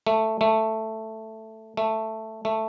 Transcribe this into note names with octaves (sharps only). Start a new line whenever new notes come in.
A3
A3
A3
A3